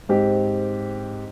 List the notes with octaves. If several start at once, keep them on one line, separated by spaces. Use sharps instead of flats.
G#2 C4 G4